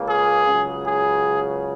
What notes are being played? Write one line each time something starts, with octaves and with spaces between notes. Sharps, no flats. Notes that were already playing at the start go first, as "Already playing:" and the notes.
Already playing: C#2 C#3 A#3
G#4
C#2 C#3 F#3
G#4